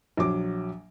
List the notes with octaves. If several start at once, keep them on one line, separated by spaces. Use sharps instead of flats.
A#1 F#3 D6